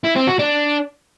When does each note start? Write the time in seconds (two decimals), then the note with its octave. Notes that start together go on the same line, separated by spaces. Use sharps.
0.04 E4
0.16 C4
0.28 F#4
0.39 D4